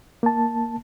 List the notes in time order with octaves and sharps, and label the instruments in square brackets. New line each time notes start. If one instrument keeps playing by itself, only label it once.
[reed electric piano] A#3 A5